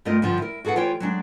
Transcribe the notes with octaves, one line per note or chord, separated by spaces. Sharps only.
G2 A3 C4 F4 A#4 D#5
G2 D3 F3
E4 A#4
F#4 G#4 A4 B4 F#5
E3 F4 G4 C5 C#5 G5
F#3 G#3 D4